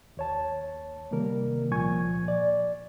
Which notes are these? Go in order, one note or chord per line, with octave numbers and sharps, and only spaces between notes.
D#2 C#5 A5
C3 D#3 G3 A#3 A#4
C#2 A#2 F3 G#5 C#6 G#6
D5